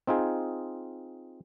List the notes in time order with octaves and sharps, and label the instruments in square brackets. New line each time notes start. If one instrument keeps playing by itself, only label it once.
[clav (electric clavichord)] C4 D#4 F4 G#4